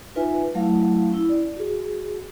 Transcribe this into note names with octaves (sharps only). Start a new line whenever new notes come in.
D#4 F4 B4 E5 G#5
F#3 A3 E4 F5
C#4 E4
D5
F#4 G#4